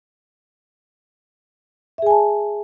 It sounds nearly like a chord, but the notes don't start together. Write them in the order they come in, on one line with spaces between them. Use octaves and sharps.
E5 G#4 G#5 A5